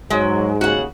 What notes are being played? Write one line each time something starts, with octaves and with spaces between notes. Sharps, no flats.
G#2 F#3 G#3
D#2 C#3 F#4 F#5